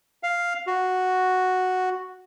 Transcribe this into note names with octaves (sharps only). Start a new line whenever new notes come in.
F5
F#4